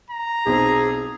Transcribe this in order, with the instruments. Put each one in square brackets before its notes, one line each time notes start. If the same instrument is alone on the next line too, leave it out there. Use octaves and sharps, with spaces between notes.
[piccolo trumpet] A#5
[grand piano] B1 C4 [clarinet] G#4